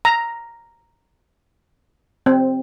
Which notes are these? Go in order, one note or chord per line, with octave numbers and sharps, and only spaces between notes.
A#5
C4